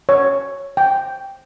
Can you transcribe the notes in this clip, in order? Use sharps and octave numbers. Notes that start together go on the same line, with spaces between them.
C#5
G5